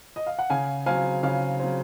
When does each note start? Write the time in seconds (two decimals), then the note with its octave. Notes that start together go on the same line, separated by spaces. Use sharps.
0.16 D#5
0.27 F5
0.39 F#5
0.50 C#3 F5 G#5
0.86 F#3 C4 F5 G#5
1.23 C#3 F5
1.59 F#3 C4